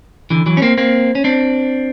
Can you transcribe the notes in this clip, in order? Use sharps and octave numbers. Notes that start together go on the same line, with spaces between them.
D3 E3
E3 F#3
C#4
A#3 C4
A#3 C4
C#4
C4 D4